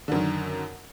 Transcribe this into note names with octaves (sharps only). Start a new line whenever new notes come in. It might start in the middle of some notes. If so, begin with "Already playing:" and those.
F#2 D3 D#3